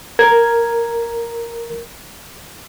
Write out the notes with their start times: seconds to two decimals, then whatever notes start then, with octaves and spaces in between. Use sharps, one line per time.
0.19 A#4 G#6